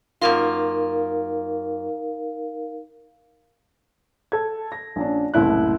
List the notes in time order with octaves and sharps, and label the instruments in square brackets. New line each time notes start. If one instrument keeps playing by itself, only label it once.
[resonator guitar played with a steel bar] F#2 A#3 F4 [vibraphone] D#4 A#4 F5
[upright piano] A4 G#6
A#6
A#1 C#4 D4
F#1 C2 A2 E4 F#6